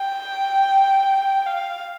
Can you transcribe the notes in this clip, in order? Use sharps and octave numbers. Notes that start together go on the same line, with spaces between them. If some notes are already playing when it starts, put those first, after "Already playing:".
Already playing: G5
F5